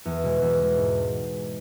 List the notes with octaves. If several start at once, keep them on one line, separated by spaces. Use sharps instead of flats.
E2
B2 G#3
E2
B2 G#3
G#2